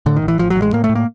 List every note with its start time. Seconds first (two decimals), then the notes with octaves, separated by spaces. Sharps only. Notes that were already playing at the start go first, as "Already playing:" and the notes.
0.06 A2 D3
0.16 D#3
0.22 A1
0.28 E3
0.39 A1 F3
0.50 F#3
0.56 A1
0.62 G#3
0.73 A2 A#3
0.84 A3
0.89 A2
0.95 A#3